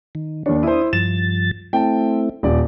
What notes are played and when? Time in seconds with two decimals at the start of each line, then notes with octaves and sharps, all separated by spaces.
0.15 D#3
0.46 D#2 D4 C#5
0.63 D4 E4 C5 D#6
0.93 G2 F3 A6 E7
1.73 A3 C4 E4 G5 A5
2.43 D#1 D5